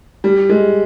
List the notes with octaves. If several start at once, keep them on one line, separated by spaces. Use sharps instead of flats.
G3
G#3